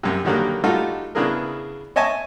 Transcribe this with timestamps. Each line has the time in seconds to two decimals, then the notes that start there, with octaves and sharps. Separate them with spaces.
0.03 F#2 C3
0.25 D3 D#3 F#3 G3 A#3
0.64 G3 A3 D#4 F4 F#4 A4
1.15 C#3 B3 D4 E4 G#4 A#4
1.96 C#5 D#5 E5 G#5 A5 C#6